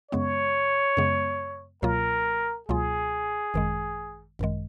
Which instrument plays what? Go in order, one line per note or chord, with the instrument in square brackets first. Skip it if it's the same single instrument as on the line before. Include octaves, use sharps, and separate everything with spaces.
[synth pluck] F#2 C#3 G#3 B3 [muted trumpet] C#5
[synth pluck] F#2 C#3 G#3 B3
[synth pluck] C#2 B2 F#3 A#3 F4 [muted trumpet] A#4
[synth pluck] C#2 B2 F#3 A#3 F4 [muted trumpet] G#4
[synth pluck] G#1 F#2 D#3 G#3
G#1 F#2 D#3 G#3